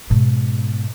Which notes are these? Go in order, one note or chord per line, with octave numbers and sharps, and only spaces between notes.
G#2 B2